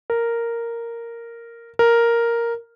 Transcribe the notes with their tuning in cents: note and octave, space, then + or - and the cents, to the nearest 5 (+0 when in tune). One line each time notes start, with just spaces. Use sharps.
A#4 -5
A#4 +0